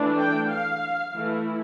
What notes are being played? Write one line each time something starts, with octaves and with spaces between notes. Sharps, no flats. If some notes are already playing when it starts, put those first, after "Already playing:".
Already playing: E3 A3 D4
G5
F5
E3 A3 E4